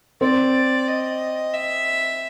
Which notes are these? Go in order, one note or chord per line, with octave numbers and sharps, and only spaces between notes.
C4 D5
D#5
E5